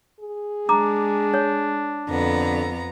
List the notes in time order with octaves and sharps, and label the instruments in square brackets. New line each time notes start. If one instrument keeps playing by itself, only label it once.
[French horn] G#4
[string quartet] G#3 [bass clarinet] D4 [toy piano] A#5 D6
[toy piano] C#5
[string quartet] F2 B3 A#5 [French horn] D3